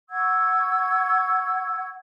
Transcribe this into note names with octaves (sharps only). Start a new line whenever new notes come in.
F#5 C#6 E6 G#6